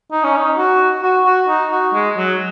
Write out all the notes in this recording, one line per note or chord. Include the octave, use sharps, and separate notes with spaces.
D#4
C#4
D#4
F#4
F#4
F#4
D#4
F#4
G#3
F#3